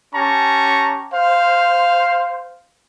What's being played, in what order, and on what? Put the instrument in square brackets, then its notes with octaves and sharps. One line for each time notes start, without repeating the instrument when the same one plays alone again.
[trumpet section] C#4 G4 A5 A#5 C#6
C5 F5